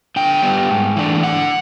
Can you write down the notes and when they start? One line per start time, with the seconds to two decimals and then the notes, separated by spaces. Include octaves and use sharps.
0.16 D3 G5
0.42 G3 B3
0.70 G#2
0.96 E3 A3 D4
1.23 D3 F#5